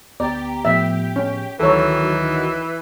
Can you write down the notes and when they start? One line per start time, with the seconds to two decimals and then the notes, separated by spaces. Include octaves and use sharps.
0.20 D2 B3 G4 D5 A#5
0.65 A2 F3 B3 E5
1.16 C#4
1.60 D2 D#3 E3 F#3 A4 C#5 A#6